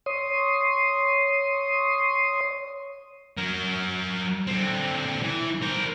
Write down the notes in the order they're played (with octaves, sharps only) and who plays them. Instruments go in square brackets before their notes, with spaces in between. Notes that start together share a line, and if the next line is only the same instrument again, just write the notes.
[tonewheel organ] C#5 C6 D#6
[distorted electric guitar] F#3 A#4
D3 C4
E3
A#4 C5